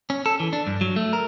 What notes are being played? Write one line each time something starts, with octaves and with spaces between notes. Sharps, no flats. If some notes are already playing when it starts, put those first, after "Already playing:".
C#4
A4
E3
D4
G2
F#3
A3
A#4